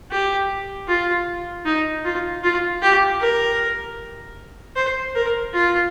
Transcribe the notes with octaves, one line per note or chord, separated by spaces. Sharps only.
G4
F4
D#4
F4
F4
G4
A#4
C5
A#4
F4